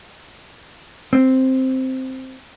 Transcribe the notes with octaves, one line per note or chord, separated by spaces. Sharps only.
C4